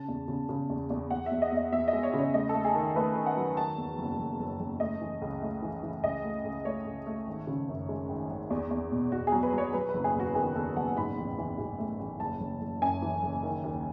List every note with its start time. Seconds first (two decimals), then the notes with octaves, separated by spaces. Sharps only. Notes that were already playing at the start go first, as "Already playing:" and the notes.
Already playing: C#3 A5
0.08 E2
0.28 C#3
0.49 C#3
0.70 E2
0.90 E2
1.11 E2 F#5
1.26 E5
1.31 E2
1.42 D#5
1.52 E2 D#5
1.72 E2 E5
1.88 D#5
1.93 G#3
2.03 C#5
2.14 C#3 C#5
2.34 A3 D#5
2.49 A4
2.54 A3
2.65 G#4
2.75 D#3
2.96 A3 B4
3.16 D#3
3.26 F#5
3.36 F#3
3.57 D#3 A5
3.78 E2
3.98 F#1
4.19 F#1
4.39 F#1
4.60 F#1
4.80 A3 D#5
5.01 E3
5.22 C#2
5.42 A3
5.62 E3
5.83 E3
6.04 C#2 D#5
6.24 A3
6.45 C#2
6.65 A3 C#5
6.86 C#2
7.07 A3
7.27 G#1
7.47 C#3
7.68 F#2
7.89 G#3
8.09 G#1
8.30 G#1
8.50 E2
8.71 E2
8.91 B2
9.12 E2 F#4
9.27 F#3 G#4
9.43 B4
9.53 F#3
9.58 C#5
9.73 F#3 B4
9.89 B4
9.94 F#1
10.04 G#4
10.15 E2 F#4
10.35 D#3 G#4
10.56 E2 A4
10.76 F#1 F#5
10.97 G#2 B5
11.17 A1
11.38 E3
11.58 G#2
11.79 A3
11.99 A1
12.20 F#1 A5
12.40 F#1
12.61 F#1
12.81 F#2 G#5
13.02 E3
13.23 F#1
13.43 D#3
13.64 D#2